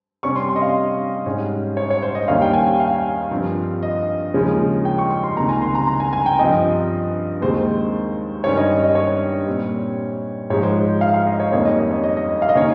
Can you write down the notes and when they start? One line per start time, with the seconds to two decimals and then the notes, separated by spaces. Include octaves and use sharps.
0.23 C3 G3 C#4 C#6
0.36 C6
0.49 C6
0.56 D#5
0.62 F5
1.26 G#2 G3 C#4
1.77 C#5
1.90 C#5
2.02 C5
2.15 D#5
2.28 D#2 D#3 G3 C#4 F5
2.42 G5
2.53 G#5
2.67 G5
2.80 F5
3.31 G2 F3 C4
3.83 D#5
4.34 D#2 C#3 F3 G#3 C#4
4.85 G5
4.98 C#6
5.10 C#6
5.24 C6
5.36 C#2 C3 D#3 A#3 A#5
5.49 G#5
5.62 C6
5.75 A#5
5.87 A#5
6.00 G#5
6.13 G#5
6.26 G5
6.39 G2 F3 C4 D#5
7.41 D#2 D#3 G#3 C4 C5
8.44 G2 D#3 G3 C#4 C#5
8.57 D#5
8.83 D#5
8.95 C#5
9.47 A#2 G3 C4
10.50 G#2 F3 G#3 C#5
10.63 C5
11.01 F5
11.14 F5
11.27 D#5
11.40 C#5
11.52 F2 D#3 G3 A#3 C#4 C#5
11.65 D#5
11.79 D#5
11.91 C#5
12.04 D#5
12.17 D#5
12.42 F5
12.49 D#5
12.55 D#3 A#3 C#4 C#5